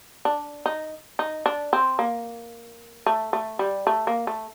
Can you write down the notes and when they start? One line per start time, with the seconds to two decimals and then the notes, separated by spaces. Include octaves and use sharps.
0.25 D4
0.66 D#4
1.19 D#4
1.46 D4
1.73 C4
1.99 A#3
3.06 A3
3.33 A3
3.59 G3
3.87 A3
4.07 A#3
4.27 A3